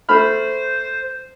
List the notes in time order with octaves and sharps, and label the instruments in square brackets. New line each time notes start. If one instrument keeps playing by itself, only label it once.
[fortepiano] A3 B5 F6 [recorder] C5